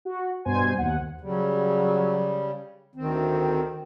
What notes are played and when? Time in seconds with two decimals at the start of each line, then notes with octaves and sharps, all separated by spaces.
0.05 F#4
0.45 G2 B2 C5 G#5
0.78 D#2 F#5
1.21 C#3 F#3 G3
2.95 D2 D#3 C4